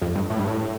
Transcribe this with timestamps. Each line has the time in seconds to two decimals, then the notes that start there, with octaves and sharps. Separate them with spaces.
0.02 F2
0.15 G2
0.30 A2
0.39 G2
0.48 A2